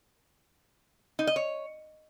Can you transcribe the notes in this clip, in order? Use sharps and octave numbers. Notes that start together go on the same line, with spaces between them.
D#4
D#5
C#5